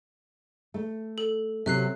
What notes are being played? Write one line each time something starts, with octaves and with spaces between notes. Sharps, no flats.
A3
A4
C3 F#3 E5 F#6 C7